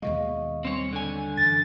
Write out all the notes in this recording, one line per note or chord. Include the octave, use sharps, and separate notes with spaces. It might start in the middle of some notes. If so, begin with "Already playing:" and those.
D#2 B2 G#3 D#5 F5 C#6
G3 C4 C#5 C6
D3 G#5
F#2 E3 A6